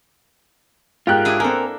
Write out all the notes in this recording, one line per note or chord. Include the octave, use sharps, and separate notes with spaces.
G#2 F4 G4 A#4 G5 F#6
D4 E4 G#4
A#3 C4 A4 A#4 G#5